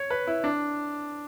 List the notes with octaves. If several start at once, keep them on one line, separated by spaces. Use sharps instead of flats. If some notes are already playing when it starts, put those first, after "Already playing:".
Already playing: C#5
B4
E4
D4